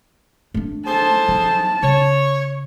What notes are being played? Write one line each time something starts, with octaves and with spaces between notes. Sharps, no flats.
A3 D4
G#4 A4 C5 A5
F3 F#3
C#3 C#5